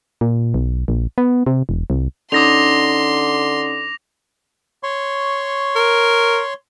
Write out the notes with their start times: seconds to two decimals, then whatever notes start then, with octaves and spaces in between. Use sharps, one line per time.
0.21 A#2
0.54 B1
0.88 A#1
1.18 B3
1.46 C3
1.69 E1
1.90 C2
2.32 D3 C#4 D#4 C6 D6 D#6 A#6 F7
4.83 C#5 C6 C#6
5.76 A#4